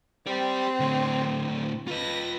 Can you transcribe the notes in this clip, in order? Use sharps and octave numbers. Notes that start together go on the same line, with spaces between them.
C4 G4 D5
A2 D3
F4 B4 D#5 A#6